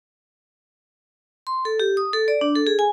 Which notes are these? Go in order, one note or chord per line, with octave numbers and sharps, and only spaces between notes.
C6
A4
G4
D#6
A4
D5
D4
A4
G#4
G#5